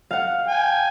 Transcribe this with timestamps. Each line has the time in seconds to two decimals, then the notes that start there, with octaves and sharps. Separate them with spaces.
0.11 F5 F#5
0.47 G5 G#5